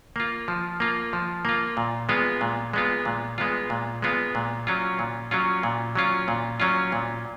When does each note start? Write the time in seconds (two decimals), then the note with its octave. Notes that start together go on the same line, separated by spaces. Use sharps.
0.16 A#3 F4
0.48 F3
0.80 A#3 F4
1.13 F3
1.45 A#3 F4
1.77 A#2
2.09 G#3 B3 F4
2.41 A#2
2.73 G#3 B3 F4
3.05 A#2
3.38 G#3 B3 F4
3.70 A#2
4.02 G#3 B3 F4
4.35 A#2
4.67 F#3 C#4 F4
4.99 A#2
5.31 F#3 C#4 F4
5.63 A#2
5.95 F#3 C#4 F4
6.28 A#2
6.60 F#3 C#4 F4
6.92 A#2